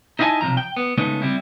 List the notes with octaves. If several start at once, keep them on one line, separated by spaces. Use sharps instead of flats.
D#4 E4 D#5 F5 G#5 A5
B1 C3 F3 A#5
G5
B3
C#3 G#3 A3 B3 D#4
G3 C4 E4